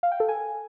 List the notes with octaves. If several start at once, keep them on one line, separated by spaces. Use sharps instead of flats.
F5
G5
A4
G#5